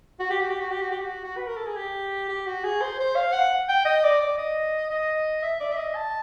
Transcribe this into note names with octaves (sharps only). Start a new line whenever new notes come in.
F#4
G4
F#4
G4
F#4
G4
F#4
G4
F#4
F#4
B4
A#4
A4
G#4
G4
G4
F#4
G#4
C5
C5
F5
F#5
G5
D#5
D5
D5
D#5
D#5
E5
D5
E5
D#5
A5